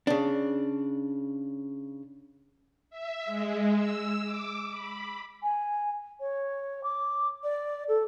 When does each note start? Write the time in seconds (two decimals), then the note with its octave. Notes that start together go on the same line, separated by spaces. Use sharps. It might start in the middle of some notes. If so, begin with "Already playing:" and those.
0.07 C#3 D4
2.90 E5
3.25 G#3
3.75 E6
4.25 D6
4.71 B5
5.42 G#5
6.19 C#5
6.83 D6
7.43 D5
7.88 A4